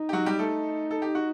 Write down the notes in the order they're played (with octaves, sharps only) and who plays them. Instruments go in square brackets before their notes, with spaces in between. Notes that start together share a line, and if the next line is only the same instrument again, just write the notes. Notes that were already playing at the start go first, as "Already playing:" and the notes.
Already playing: [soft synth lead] D#4
[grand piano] G4
F#3 F#4
G3 G4
A3 A4
A4
G4
F#4